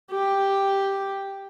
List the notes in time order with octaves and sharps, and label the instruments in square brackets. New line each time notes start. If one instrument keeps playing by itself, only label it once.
[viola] G4